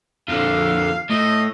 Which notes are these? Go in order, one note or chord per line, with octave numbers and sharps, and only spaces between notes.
F2 D3 F5
A2 D#5